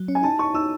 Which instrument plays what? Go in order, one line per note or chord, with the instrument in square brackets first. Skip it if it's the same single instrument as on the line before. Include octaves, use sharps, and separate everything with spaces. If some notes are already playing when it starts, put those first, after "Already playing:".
Already playing: [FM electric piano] F#3
C#4
[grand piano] G#5
[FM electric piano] D#4 [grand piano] A5
[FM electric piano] D#4 [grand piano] C#6
[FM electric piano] D#4 [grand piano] E6